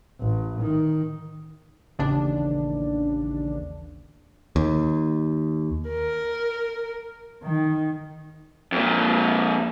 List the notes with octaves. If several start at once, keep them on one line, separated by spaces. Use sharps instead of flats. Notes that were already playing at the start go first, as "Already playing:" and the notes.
A1
D#3
A1 D#2 C#3 D4
D#2
A#4
D#3
F2 A#2